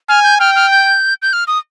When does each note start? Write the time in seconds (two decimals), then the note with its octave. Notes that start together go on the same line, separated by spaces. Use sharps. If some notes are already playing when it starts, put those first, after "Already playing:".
0.09 G#5 F6
0.24 G6
0.40 G5 F6
0.56 F6
0.70 G6
1.22 G6
1.33 F6
1.47 D#6